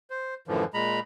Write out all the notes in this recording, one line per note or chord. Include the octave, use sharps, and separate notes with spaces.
C5
F#2 A2 D3 E3 F3
A#2 G#3 A#5 B5